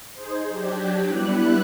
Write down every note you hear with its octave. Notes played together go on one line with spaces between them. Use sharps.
D#4 G#4 C5
F#3 D4 G4
G3 B3 E4 F#6